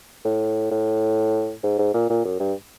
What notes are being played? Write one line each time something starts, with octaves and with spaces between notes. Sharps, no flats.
A2
A2
G#2
G#2
A#2
A#2
F#2
G2